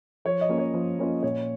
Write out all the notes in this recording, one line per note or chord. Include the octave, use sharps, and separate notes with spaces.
F3 C#5
D#5
A#3 C#4 F4
C#5
F3
A#3 C#4 F4
A#2 C#5